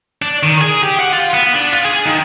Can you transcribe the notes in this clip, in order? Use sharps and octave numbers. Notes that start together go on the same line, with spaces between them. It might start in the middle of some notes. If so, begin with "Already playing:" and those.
D4
D#3
G#4
G4
F#5
F4
B3
D4
F4
G#4
D#3